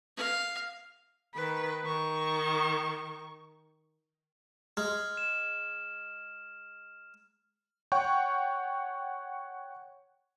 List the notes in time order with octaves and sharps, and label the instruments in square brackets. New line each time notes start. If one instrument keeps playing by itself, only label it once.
[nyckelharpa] F5
[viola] D#3 B4
D#3 C#6
[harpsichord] G#3 [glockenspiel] F6
[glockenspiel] E7
[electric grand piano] C#5 F#5 G5 C#6